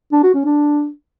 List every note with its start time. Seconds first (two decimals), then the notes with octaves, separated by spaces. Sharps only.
0.12 D4
0.23 F#4
0.34 C#4
0.46 D4